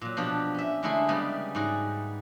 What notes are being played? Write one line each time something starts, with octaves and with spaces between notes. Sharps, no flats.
A#2 F#3
B2 F3 D4 F#4 G4
C#4 E5
D3 G#3 A3 E4 G#4 C5
C#3 G3 G#3 B3
G#2 G3 F#4 G#4